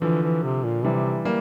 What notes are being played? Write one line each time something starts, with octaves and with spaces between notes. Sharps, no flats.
D3 E3 F3
E3
C3
A#2
C3 E3 G3
G3 A#3